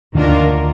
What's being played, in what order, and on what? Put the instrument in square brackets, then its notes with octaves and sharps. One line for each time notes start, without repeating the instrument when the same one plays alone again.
[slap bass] D2 D3 [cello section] D#3 A#3 D4 F4 A#4